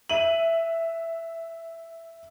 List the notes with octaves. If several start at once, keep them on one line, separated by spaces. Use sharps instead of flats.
E5 D#7 F#7